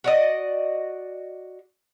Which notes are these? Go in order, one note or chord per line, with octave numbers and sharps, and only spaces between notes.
F#4 D5 D#5